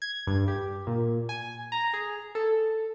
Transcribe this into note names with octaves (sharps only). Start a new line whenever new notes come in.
G#6
G2
G4
A#2
G#5
A#5
G#4
A4